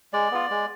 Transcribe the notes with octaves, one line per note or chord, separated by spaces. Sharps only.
G#3 D5
B3 F4
G#3